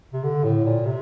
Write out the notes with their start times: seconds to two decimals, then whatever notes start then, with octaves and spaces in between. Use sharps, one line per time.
0.13 C3
0.24 D3
0.44 A2
0.65 A#2
0.85 C3